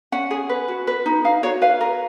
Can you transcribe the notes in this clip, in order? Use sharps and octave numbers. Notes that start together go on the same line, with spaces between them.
C#4 F#5
G#4
B4
F#4
B4
D#4
D#4 F5
F#4 C#5
B4 F5
A#4